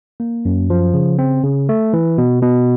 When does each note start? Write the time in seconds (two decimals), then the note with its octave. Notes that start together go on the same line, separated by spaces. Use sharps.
0.20 A#3
0.45 F#2
0.70 F3
0.94 C#3
1.19 C4
1.44 C#3
1.69 A3
1.93 E3
2.18 B2
2.42 B2